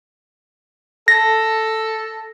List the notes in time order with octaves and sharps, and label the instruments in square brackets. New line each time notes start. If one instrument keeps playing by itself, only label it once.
[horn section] A4 [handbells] A#6